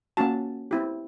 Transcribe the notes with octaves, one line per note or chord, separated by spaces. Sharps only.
A#3 C#4 F#4 A5
C4 E4 G4